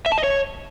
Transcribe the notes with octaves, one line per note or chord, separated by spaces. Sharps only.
E5
A5
D#5
C#5